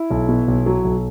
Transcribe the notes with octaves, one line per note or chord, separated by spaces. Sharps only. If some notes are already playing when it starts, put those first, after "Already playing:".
Already playing: E4
B1
B2
B1
F#3
B1